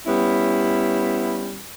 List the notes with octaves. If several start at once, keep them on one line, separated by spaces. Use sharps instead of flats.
G3 B3 C#4 E4